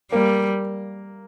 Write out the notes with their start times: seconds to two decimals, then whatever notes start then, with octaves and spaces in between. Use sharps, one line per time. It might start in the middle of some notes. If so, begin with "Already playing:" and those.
0.12 G3 A#3